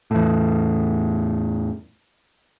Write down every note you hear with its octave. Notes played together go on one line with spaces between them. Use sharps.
E2 A2